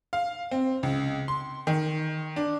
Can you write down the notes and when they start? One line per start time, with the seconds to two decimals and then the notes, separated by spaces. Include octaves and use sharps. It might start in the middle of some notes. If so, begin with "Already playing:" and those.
0.13 F5
0.51 C4
0.83 C#2
1.28 C6
1.67 D#3
2.36 D4